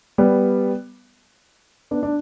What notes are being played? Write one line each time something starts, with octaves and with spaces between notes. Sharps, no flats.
G3 B3
B3 D4
D4